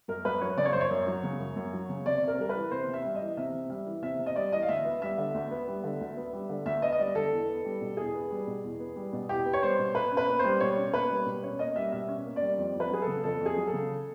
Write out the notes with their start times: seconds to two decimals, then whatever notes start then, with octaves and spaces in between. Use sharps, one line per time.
0.08 F#2 A#4
0.25 F#2 B4
0.41 F#3 C#5
0.57 C#3 D5
0.65 C#5
0.73 F#2 C5
0.81 C#5
0.91 F#2
1.07 F#3
1.23 C#3
1.39 F#2
1.56 F#2
1.73 F#3
1.89 C#3
2.05 C3 D5
2.23 C3
2.28 A#4
2.38 G3 A#4
2.49 B4
2.55 E3
2.71 C3 C5
2.88 C3
2.93 E5
3.05 G3
3.15 D#5
3.21 E3
3.37 C3 E5
3.54 C3
3.70 G3 E5
3.87 E3
4.02 C3 E5
4.19 C3
4.26 D#5
4.36 G3 D5
4.52 E3 D#5
4.62 F5
4.69 D2 E5
4.85 B3
5.02 G3 E5
5.18 D3
5.34 D2
5.51 B3
5.68 G3
5.84 D3
6.01 D2
6.17 B3
6.33 G3
6.49 D3
6.66 D2 E5
6.82 B3 D#5
6.92 D#5
6.99 G3 D5
7.15 D3 A4
7.31 E2
7.48 B3
7.65 G3
7.81 B2
7.97 E2 G#4
8.14 B3
8.31 G3
8.47 B2
8.64 E2
8.80 B3
8.96 G3
9.13 B2
9.29 E2 G4
9.45 B3
9.53 C#5
9.62 G3 C5
9.79 B2
9.95 B2 B4
10.11 C#4
10.17 B4
10.28 A#3
10.39 G3 C5
10.61 B2 C#5
10.77 C#4
10.94 A#3 B4
11.10 G3
11.26 B2
11.43 C#4 C#5
11.59 A#3 D#5
11.76 G3 E5
11.92 B2 E5
12.08 C#4
12.25 A#3
12.36 G3 D5
12.58 F2
12.74 F2
12.80 B4
12.91 F#3 G#4
13.02 A4
13.07 C#3
13.24 F2 A4
13.40 F2
13.46 G#4
13.57 F#3
13.67 A4
13.73 C#3